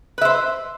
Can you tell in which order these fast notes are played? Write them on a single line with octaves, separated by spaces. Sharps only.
B4 E5 C5